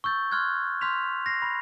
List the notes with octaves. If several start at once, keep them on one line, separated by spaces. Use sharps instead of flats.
C#6 E6 G6 A6
C6 C#6 F6 F#6 G#6
C6 F6 G6 B6 F7
A#6 C7
B5